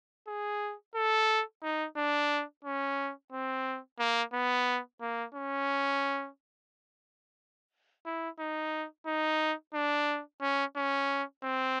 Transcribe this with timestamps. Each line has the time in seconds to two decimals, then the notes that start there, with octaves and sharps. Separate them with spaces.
0.27 G#4
0.95 A4
1.63 D#4
1.97 D4
2.65 C#4
3.32 C4
3.99 A#3
4.33 B3
5.01 A#3
5.35 C#4
8.06 E4
8.39 D#4
9.06 D#4
9.74 D4
10.41 C#4
10.76 C#4
11.43 C4